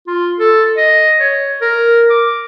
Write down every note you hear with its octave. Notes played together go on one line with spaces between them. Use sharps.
F4
A4
D#5
C#5
A#4
D6